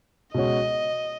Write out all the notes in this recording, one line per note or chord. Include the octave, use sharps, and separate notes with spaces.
B2 G#3 C#4 F#4 C#5 D#5